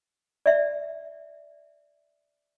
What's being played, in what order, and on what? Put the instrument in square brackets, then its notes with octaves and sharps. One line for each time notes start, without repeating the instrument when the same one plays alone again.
[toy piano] D5 E5